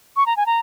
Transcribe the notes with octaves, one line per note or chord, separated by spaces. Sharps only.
C#6
A#5
G#5
A#5